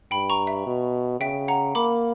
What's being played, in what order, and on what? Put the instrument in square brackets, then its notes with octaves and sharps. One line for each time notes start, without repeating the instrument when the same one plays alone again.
[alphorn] G2 [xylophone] G5 B5
[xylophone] A#5 C#6
E5
[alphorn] B2
[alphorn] C#3 [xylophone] E5 G5
[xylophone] F#5 A#5
[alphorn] A#3 [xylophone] B5 D6